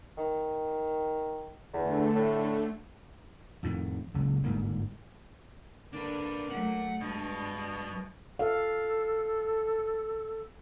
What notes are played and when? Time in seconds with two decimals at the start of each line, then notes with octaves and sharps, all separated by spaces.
0.17 D#3
1.73 E2 D3 A3
2.15 A2
3.63 F2 A2 D#3
4.14 F#1 C#2
4.44 G1 G#2 A#3
5.93 D3 A#3 D4 B4
6.51 F#3 A3 F#5
7.01 G2 B2 G#3
8.39 A4 F5